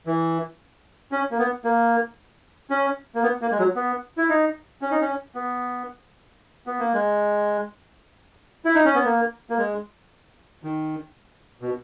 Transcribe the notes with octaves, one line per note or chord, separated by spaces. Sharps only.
E3
C#4
A#3
B3
A#3
C#4
A#3
B3
A#3
G#3
F#3
B3
E4
D#4
C#4
D#4
C#4
B3
B3
A#3
G#3
E4
D#4
C#4
B3
A#3
A#3
G#3
D#3
B2